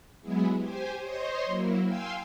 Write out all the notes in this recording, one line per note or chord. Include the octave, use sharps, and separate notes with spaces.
F#3 G#3 B3 E4 G#4
G4 C5 G#5
C5 C#5 D#5 C6
F#3 A#3 E4
F5 G5 G#5 C6 E6